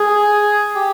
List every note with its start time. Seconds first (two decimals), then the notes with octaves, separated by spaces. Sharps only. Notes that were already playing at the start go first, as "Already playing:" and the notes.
Already playing: G#4
0.76 G4